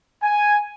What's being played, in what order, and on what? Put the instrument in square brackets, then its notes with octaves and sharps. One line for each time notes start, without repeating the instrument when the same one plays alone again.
[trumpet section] G#5